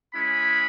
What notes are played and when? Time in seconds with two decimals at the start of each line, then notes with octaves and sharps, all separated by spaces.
0.14 G#3 C#4 E4 B5